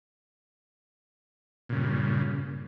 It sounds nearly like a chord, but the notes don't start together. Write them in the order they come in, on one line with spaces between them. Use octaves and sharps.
A#2 C#3 G2